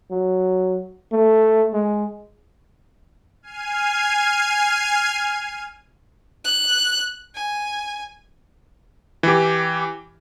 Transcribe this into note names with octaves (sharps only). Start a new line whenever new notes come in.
F#3
A3
G#3
G#5 F6 G#6 C7 D#7
F#6
G#5
E3 G4